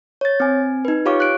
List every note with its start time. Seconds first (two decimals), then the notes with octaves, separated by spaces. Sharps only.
0.21 C#5 A6
0.40 C4 G#5
0.85 D#4 B4
1.06 F4 G4 C#5 F5 C#6 D6
1.20 F#6 D7